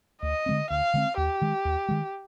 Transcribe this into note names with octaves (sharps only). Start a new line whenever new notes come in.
D2 D#5
D3 G#3 C4
D2 F5
D3 G#3 C4
D#2 G4
D#3 G#3
D#2
D#3 G#3